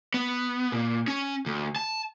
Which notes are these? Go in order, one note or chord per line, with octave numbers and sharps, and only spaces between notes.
B3
A#2
C#4
D2
A5